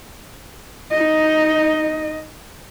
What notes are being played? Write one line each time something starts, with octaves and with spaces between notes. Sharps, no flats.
D#4 D#5